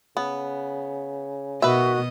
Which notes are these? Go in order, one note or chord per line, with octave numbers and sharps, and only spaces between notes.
C#3 B3
B2 D#3 F#4 B4 D#5 E5